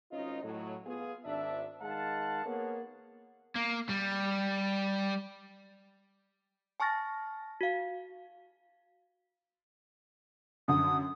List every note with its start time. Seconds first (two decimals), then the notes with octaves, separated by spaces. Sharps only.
0.11 G#1 C#4 D#4 F4 D#5
0.43 A2 F#3
0.86 B3 F4 G#4
1.25 G#1 D4 E5
1.81 D#3 G#3 F5 F#5 A5
2.45 A#3 B3 G#4 A#4 C#5 F#5
3.56 A#3
3.90 G3
6.80 G#5 A5 C#6 F6 A6 A#6
7.61 F#4 F5
10.68 F#2 D3 D#6